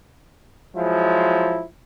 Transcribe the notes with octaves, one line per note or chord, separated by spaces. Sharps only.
F3 F#3 G#3 E4